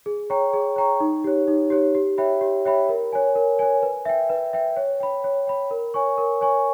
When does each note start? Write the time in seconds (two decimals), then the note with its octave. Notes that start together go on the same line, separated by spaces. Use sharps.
0.06 G#4
0.30 C#5 G5 A#5 C#6
0.53 G#4
0.76 C#5 G5 A#5 C#6
1.00 D#4
1.24 G4 C#5
1.48 D#4
1.70 G4 C#5
1.95 G4
2.18 C#5 E5 G5 B5
2.41 G4
2.65 C#5 E5 G5 B5
2.89 A#4
3.13 C#5 G#5
3.35 A#4
3.59 C#5 G#5
3.83 B4
4.05 E5 G5
4.30 B4
4.53 E5 G5
4.77 C#5
5.00 G5 B5
5.24 C#5
5.47 G5 B5
5.71 A#4
5.94 C#5 G#5 C#6
6.18 A#4
6.41 C#5 G#5 C#6